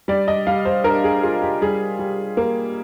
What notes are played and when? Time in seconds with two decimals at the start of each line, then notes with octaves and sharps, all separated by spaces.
0.08 G3 D5
0.28 D#5
0.47 G3 F5
0.65 C5
0.84 D4 A#4
1.04 G#4
1.23 F4 G#4
1.42 G4
1.62 G3 G#4
1.99 G3
2.37 A#3